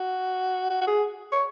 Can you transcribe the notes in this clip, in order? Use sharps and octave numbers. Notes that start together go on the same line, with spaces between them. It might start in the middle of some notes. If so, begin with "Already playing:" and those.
Already playing: F#4
F#4
F#4
G#4
C#5